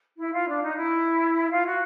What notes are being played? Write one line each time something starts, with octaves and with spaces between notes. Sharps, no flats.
E4
F4
D4
D#4
E4
F4
F#4